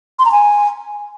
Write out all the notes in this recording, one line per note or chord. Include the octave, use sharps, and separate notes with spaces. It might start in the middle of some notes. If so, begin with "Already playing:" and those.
C6
A#5
G#5